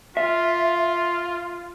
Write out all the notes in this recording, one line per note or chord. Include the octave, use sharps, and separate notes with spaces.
F4 E5